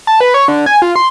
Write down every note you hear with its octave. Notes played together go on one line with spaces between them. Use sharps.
A5
B4
C#5
D3
G#5
F4
C6